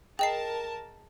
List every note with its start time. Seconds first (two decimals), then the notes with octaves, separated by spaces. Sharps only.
0.19 G#4 A#4 D#5 G5 A5 C7